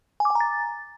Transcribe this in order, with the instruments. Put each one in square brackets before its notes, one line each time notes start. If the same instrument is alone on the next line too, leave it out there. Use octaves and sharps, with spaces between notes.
[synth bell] G#5
D6
G#5
A#5
A6